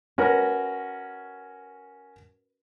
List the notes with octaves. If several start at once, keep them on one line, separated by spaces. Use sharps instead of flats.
C#4 F#4 A#4 B4